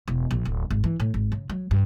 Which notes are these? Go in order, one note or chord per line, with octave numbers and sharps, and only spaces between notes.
E1
A#1
D1
G#1
E3
A2
G#1
C#3
F#3
G2